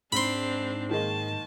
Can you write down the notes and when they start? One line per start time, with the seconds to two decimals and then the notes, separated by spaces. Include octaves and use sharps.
0.12 G#2 C4 D4 B5 C6
0.91 D#3 G#3 A#3 A5